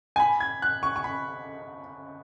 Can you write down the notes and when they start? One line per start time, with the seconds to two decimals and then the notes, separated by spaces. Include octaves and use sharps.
0.16 G#5
0.20 B5
0.40 G#6
0.62 F#6
0.83 C#6
0.96 C#6
1.04 B5